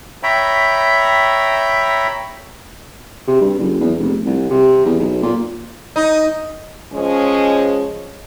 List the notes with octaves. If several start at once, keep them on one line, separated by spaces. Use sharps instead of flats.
C#5 E5 G5 A#5 B5
C3
G2
F#1
E2
F1
C2
C3
E2
B1
A#2
D#4
F3 G#3 C#4